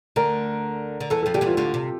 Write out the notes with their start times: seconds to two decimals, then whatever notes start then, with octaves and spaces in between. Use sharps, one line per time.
0.16 D2 D3 A#4
1.00 D3
1.10 E2 E3 A4
1.23 F2 F3 A4
1.34 D3 G4
1.41 E2 E3 F4
1.57 D2 D3 F4
1.74 C3